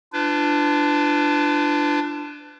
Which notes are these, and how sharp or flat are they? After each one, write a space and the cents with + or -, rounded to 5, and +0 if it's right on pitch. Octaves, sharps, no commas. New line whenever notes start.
D4 +5 F4 -40 B4 +35